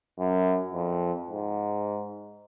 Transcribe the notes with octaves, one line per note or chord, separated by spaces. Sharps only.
F#2
F2
G#2